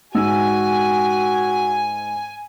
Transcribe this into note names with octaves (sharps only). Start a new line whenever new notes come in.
G#2 F#4 G#5 E6